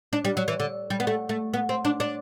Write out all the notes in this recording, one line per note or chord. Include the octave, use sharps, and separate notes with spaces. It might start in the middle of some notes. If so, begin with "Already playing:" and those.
D4
G3
F#3
E3
D3
G3
B3
A3
A3
B3
C4
D4
D4